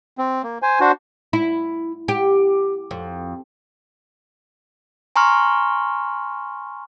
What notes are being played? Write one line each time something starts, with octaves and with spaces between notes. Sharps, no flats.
C4
A#3
C5 G#5
D4 F#4 C5
E4
G4
F2
G#5 A#5 C6 C#6 F6